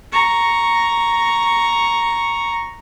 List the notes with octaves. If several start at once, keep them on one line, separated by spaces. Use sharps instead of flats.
A#5 C#6